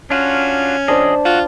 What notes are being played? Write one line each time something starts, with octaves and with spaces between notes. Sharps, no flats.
C#4 D4 F4 F#4
F3 D4 G#4 C5 D5 D#5
F4 F#4